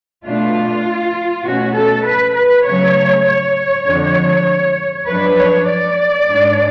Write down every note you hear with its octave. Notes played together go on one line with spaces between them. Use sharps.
B2 A3 D4 F4
B2 A3 C#4 F#4
A4
B4
B4
C#3 F#3 A3 C#4 C#5
C#5
F2 D3 F3 G#3
F#2 F3 G#3 D4 B4
C#5
D5
G#2 G#3 D4